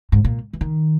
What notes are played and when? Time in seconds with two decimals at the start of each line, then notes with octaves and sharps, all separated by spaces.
0.12 G#2
0.25 A#2
0.53 E3
0.61 D#3